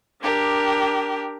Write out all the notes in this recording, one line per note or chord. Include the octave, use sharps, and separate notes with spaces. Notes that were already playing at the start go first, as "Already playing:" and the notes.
D4 G4 A#4